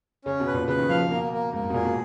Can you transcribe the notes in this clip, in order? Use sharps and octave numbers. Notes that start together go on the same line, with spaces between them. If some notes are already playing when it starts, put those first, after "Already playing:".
C#3 C#4
B2
B4
A#2
C#3 B4
D#3
F3 F5
C#3
B2 A#3
A#3
G#2 A#3
G#2
B2
A#2 G#4
B2